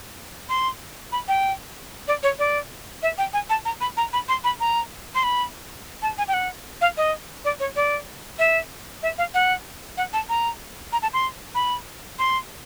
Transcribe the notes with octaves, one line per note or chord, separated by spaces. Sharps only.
C6
B5
G5
D5
C#5
D5
E5
G5
G#5
A5
A#5
B5
A#5
B5
C6
B5
A#5
C6
B5
A5
G#5
G5
F#5
F5
D#5
D5
C#5
D5
E5
E5
F5
F#5
F#5
A5
A#5
A#5
A5
C6
B5
C6